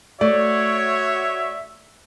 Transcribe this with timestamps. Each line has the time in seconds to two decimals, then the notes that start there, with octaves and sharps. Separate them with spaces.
0.21 A3 F#4 C#5 D5 E5